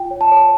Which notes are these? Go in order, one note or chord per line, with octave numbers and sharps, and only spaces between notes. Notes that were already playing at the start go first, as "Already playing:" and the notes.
Already playing: F4 G5
C#5
A5
C#5